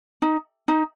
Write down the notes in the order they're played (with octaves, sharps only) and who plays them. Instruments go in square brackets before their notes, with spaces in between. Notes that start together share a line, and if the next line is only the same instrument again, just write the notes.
[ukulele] D#4
D#4